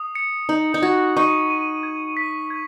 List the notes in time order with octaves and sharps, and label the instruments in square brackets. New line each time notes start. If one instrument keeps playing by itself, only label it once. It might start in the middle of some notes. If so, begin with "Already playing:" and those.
Already playing: [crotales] D#6
C#7
[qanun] D#4 [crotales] F#7
[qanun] D#4
[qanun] F#4 [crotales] G#6
[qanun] D#4 [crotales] C#6
[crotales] D#7
G#6
B6
G#6